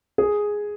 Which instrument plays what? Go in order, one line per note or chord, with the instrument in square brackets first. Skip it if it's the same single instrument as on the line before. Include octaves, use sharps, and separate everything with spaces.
[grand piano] G#4